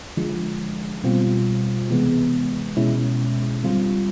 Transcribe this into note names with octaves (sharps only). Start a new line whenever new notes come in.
D3 F3 G#3
B2 G3 C4 F4
C3 E3 G#3 B3
B2 G#3 C#4 E4
D3 G3 C4 F4